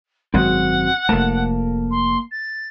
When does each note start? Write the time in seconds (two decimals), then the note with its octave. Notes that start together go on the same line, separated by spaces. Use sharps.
0.34 G#1 F#2 G#3 C4 F#4 F#5
1.09 F1 A3 A#3 A#4 A5
1.91 C6
2.31 A6